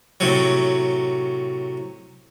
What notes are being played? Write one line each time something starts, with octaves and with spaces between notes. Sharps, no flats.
A2 C3 F#3